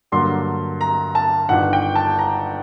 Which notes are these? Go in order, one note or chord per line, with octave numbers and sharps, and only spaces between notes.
G2 D3 F#3 A#3 D4 C6
A#5
A5
G1 G2 D#3 F#5
G5
A5
A#5